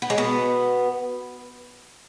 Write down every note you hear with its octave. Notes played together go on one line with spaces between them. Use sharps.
B3
G#3
B2 B3